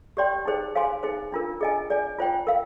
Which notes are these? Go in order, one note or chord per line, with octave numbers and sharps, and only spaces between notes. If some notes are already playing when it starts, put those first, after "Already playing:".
G4 D5 G5 C6
D#4 G#4 C5
G#4 C5 F5 G#5 C6
D#4 G#4 C5
D4 F4 A#4
G#4 D#5 G#5
G#4 D5 G#5
F4 C5 G5
A#4 F5